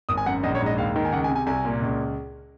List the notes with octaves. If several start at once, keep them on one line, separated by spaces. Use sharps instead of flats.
G#1 D#6
G#5
F#2 F#5
A#1 D#5
C#5
G#2
D#5
D#2 F5
D#3
G#5
C#2 F#5
G#5
C3
G#5
C2 G#5
A#2
C#2